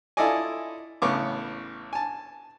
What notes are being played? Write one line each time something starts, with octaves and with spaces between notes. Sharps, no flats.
E4 F4 A4 D5 D#5 G#5
A1 C#3 B3 C#6 D6
G#5 A5